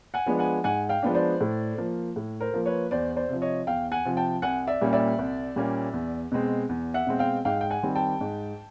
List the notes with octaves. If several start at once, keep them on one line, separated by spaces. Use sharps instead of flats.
F#5 G#5
F3 G#3 B3 D4
F#5 G#5
G#2 F#5 G#5
F5 G5
F3 G#3 B3 D4
C5 D5
A2
F3 A#3
A2
A#4 C5
F3 A#3
B4 C#5
E2 C5 D5
C5 D5
C3 F3
C#5 D#5
E2 F5 G5
F#5 G#5
C3 F3
G5 A5
C2 F#5 G#5
D5 E5
A#2 G3 A#3 C#4
D5 E5
C2
A#2 G3 A#3 C#4
E2
B2 G#3 C4
E2
E5 F#5
B2 G#3 C4
F5 G5
G#2 F5 G5
G5
F#5 G#5
D#3 G3 C4
G5 A5
G#2